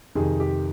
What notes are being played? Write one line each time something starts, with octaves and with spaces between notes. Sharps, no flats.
F2 C3 D#3 G#4
G4